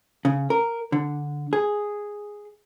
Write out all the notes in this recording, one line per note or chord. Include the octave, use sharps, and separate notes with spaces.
C#3
A#4
D3
G#4